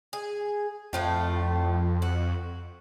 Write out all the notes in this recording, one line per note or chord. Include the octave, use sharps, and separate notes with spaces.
G#4
F2 A2 F3 A3
F#4